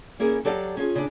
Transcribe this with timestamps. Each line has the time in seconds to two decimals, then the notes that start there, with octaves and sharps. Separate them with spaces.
0.19 A#3 C#4 E4 G#4 A#4
0.45 F#3 G4 A4 D5 D#5 F5
0.77 C#4 F4 G#4
0.95 C#3 D4